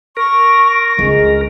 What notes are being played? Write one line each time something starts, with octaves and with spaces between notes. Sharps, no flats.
A#4 C#6
C#2 G#3 D4